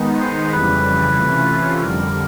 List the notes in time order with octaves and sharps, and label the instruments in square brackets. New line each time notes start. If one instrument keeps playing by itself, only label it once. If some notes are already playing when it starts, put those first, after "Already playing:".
Already playing: [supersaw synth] D#3 G#3 B3 D#4
[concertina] C5
[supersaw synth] F2 C#3 E3 G3 [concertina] B4
[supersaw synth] C3 E3 A3 C#4 F4
[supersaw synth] F2 D3 G3 [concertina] A#4